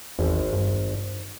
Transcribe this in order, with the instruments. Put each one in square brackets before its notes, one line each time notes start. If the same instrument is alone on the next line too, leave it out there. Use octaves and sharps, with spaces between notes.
[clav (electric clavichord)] G#1 [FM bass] E2
[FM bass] G2